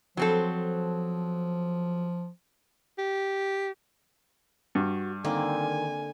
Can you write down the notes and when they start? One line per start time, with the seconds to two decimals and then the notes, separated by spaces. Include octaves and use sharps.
0.17 F3 F#3 C4 A4
2.98 G4
4.75 G2 F#4
5.24 D3 D#3 A#3 C4 G#5